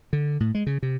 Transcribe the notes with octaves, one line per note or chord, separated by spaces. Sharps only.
D3
A2
G#3
C#3
C3